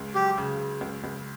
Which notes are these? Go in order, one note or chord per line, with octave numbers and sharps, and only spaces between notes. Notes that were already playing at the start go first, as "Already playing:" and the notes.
Already playing: C#2
F#3 G4
C#3
C#3
C#2
C#2